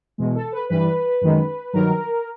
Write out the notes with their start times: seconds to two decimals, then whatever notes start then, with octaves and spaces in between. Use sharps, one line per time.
0.18 E2 B2 G#3
0.35 A4
0.52 B4
0.70 G2 E3 G3 B4
1.21 F#2 D#3 G#3
1.73 G2 D#3 F#3 A#4